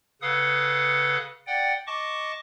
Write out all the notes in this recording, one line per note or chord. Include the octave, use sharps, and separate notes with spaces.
C#3 A4 B4 F5 F#5 D#6
D5 F#5 G5
D#5 A5 C#6 D6